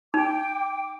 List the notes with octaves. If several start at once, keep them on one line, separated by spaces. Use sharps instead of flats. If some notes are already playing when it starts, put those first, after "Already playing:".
D#4 G5 D6